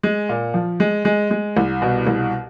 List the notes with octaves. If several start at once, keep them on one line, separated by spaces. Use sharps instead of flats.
G#3
A#2
F3
G#3
G#3
G#3
C2
B2
C2